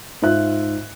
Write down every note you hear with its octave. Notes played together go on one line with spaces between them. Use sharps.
G#2 F4 E5 F#6